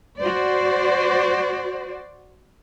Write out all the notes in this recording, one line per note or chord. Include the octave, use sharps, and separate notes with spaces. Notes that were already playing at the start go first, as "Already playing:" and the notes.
F#4 C5 D5